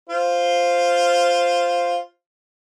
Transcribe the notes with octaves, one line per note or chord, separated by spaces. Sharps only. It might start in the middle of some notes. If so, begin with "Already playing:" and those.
F4 C5